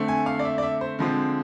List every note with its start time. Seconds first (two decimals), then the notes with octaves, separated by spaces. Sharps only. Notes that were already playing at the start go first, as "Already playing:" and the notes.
Already playing: D3 A3 C4
0.08 G#5
0.26 F5
0.39 D5
0.45 E5
0.58 D5
0.63 E5
0.81 C5
0.99 D3 F3 G#3 C4